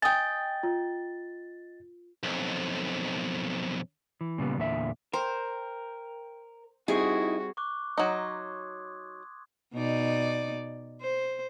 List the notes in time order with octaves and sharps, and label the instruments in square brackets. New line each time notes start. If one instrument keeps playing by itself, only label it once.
[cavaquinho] D#5 G5 [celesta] G#5 D#6 [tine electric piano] A6
[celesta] F4
[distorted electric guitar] B1 F2
[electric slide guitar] E3
A#2 C#3 G3 B3
E2 A#2 D3 E5
[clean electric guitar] A#4 [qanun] C5 [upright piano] G5
[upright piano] G3 C4 [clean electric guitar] D#4 E4 [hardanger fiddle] F#4 [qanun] G#4
[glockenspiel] C#6 D6 F#6
[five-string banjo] F#3 D#4 [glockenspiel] C6 D#6 G#6
[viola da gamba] B2 D#4 D5
C5